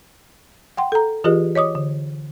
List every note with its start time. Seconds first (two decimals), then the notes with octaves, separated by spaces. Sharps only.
0.77 F#5 G5 C6
0.92 A4 A#5
1.24 E3 F4 G4 G#4 B4 D#5
1.55 C#5 D#5 D6 D#6
1.75 D3